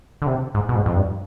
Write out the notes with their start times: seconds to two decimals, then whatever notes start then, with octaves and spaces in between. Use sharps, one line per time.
0.22 D3
0.27 C3
0.54 G#2
0.69 B2
0.75 G#2
0.86 F2
0.96 G2